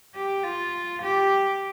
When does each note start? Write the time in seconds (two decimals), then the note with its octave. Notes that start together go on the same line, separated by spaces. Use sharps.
0.15 G4
0.44 F4
1.02 G4